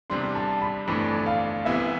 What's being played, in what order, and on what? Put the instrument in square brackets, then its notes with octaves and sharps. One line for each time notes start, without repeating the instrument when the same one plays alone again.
[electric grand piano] E2 C3 G3 D4 [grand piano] C6
[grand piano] A5
B5
[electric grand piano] G1 F2 E3 A3 D4 [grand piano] B5
[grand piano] F5
[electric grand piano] C2 C3 E3 B3 E4 [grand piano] E5